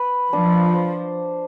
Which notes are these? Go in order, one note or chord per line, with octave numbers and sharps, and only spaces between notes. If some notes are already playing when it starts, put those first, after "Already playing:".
Already playing: B4
F3 D4
C5